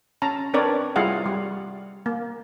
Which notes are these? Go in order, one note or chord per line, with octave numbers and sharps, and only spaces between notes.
C#4 A5 A#5
C4 D4 A#4 B4 C#5 D5
G3 E4 F4 G#4 F5 F#5
G3
A#3